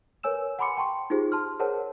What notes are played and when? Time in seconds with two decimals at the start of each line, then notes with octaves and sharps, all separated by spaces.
0.23 A#4 B4 C#5 G#5 E6 E7
0.59 F#5 G#5 B5 C6 D6 C#7
0.77 G5 A5 C6 C#6
1.10 D#4 F4 G4 G#4 C5
1.32 A5 C6 F6
1.59 G#4 A#4 C5 C#5 F#5 A5